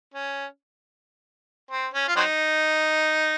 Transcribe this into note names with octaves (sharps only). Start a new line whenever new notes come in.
C#4
C4
C#4
F4
F#3 C4 D#4